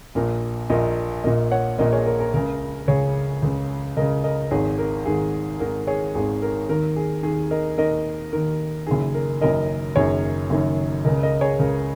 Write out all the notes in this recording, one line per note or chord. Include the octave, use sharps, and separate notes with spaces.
A#1 A#2 A#4
A#1 A#2 A#4 D#5
A#1 A#2 A#4 D#5
C#5 F#5
A#1 A#2 A#4 D#5
G#4 C#5
A#4
A#4
C#2 C#3 A#4
C#2 C#3 G#4 C#5
C#2 C#3
C#2 C#3 A#4 D#5
A#4 D#5
G#1 G#2 D#3 G#4 C#5
A#4
G#1 G#2 D#3 G#4
G#1 G#2 D#3 A#4
G#4 C#5
G#1 G#2 D#3 G#4
A#4
D#2 D#3 A#4
G#4
D#2 D#3 G#4
A#4 D#5
D#2 D#3 A#4 D#5
D#2 D#3 A#4
F#1 F#2 D#3 G#4
A#4
F#1 F#2 D#3 A#4 D#5
F#1 F#2 D#3 G#4 C#5
F#1 F#2 D#3
C#2 C#3 A#4 D#5
A#4 D#5
G#4 C#5
C#2 C#3 A#4